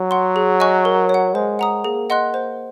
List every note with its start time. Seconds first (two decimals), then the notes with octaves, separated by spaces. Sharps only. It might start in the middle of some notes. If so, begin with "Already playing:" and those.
Already playing: F#3
0.11 F#5 C6
0.36 G#4
0.60 D#5 G#5 C#6 F#6
0.85 A#4
1.09 C#5 F#5
1.34 G#3 C5
1.59 F#5 A#5 D#6
1.84 A#3 G#4
2.10 D#5 F#5 C6 F#6
2.34 C5